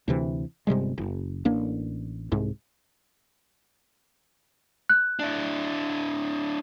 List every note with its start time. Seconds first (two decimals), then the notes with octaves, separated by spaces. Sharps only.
0.08 D2 C3 E3
0.67 G1 C3 G3 G#3
0.98 F#1
1.45 A1 A#3 D4
2.32 C2 G#2
4.89 F#6
5.19 D4 E4